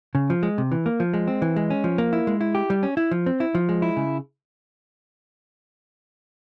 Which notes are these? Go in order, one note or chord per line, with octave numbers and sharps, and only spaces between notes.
C#3
F3
G#3
C3
E3
A#3
F3
G#3
C4
E3
G#3
C#4
F3
A#3
E4
G#3
E4
G4
G3
C#4
E4
F3
C4
E4
F3
G#3
E4
C#3